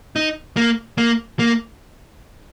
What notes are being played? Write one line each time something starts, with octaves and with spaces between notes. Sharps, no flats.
D#4
A#3
A#3
A#3